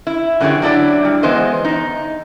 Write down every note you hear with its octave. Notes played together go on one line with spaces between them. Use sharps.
E4
F#2 D3 E3 G4 G#4 C#5
F#3 D4 E4 D5
G3
E3 G#3 B3 C5 D#5
E2 D#4